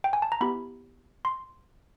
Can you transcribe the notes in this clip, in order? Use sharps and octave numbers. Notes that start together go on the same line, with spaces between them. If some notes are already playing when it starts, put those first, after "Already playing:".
G5
G#5
A5
A#5
B3 E4 G4 B5
C6